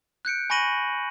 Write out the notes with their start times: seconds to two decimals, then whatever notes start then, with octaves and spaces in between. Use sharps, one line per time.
0.25 F#6 G6 C#7 D7
0.50 G#5 B5 C#6 A#6 D#7 F#7